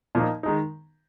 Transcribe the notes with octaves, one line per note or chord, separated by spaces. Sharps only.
A#2 F3 A#3 D#4
D#3 G#3 D#4